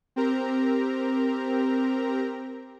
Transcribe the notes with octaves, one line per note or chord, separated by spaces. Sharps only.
C4 G4 A#4 A#5